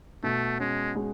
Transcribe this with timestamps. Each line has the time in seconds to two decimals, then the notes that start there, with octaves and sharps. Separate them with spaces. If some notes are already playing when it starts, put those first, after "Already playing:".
0.23 B2 A3
0.60 G#3 C#4
0.96 G#3